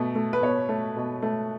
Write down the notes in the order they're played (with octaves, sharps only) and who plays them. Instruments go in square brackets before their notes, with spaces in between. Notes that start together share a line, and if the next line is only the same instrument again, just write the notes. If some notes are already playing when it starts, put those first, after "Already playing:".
Already playing: [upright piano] B2 A3
A3
B4
B2 C#5
A3
B2
A3